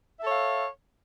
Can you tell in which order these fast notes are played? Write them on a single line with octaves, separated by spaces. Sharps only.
E5 A4 C#5 F5